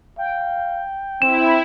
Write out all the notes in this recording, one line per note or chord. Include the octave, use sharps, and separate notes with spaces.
F5 G5
C4 E4 E7